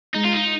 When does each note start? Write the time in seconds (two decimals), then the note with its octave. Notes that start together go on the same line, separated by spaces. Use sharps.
0.14 G#3 D#4
0.25 F4
0.34 D#4